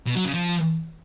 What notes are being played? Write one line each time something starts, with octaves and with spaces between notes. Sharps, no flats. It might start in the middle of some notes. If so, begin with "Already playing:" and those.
B2
F#3
C#3
F3